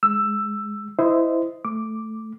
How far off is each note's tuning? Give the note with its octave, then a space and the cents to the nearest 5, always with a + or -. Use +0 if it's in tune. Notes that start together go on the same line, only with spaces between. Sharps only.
G#3 +0 E6 +10
E4 +0 C5 -25 D#5 +0
A3 +0 D6 +0